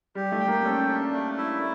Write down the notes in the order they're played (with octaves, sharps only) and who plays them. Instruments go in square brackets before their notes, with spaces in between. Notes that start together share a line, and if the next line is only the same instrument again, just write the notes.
[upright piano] G3 [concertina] G4
[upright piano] A3
[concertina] G5
[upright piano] A#3
[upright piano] C#4 [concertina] A4
[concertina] D4
A3
E4